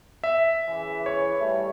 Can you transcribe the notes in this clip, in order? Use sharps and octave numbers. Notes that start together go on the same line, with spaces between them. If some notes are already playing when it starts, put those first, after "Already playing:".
E5
C#3 E3
C#5
G3 A3